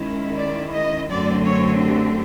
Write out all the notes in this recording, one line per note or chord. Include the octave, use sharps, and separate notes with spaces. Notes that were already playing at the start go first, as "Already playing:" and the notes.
Already playing: D#3 G#3 C#4 E4
D5
D#5
F#2 D3 F#3 A3 C4 D5
C#5
G4